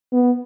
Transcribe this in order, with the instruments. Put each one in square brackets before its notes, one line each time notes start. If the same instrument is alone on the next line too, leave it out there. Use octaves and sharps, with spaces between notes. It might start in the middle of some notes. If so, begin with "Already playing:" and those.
[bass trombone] B3